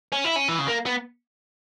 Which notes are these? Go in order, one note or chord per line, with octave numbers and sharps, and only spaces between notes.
C#4
E4
C#4
E3
C#3
A#3
B3